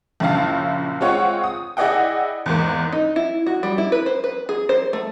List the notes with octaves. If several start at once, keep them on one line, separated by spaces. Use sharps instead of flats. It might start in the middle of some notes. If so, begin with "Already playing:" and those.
A#1 F#2 C#3 E4 F5 A5
G#3 C4 F4 C#5 F#5
D#6
E4 G#4 D5 D#5 F#5 G5
E2 G#2 A#3
D#4
E4
F#4
G3
E4
B4
C5
B4
G#4
C5
A3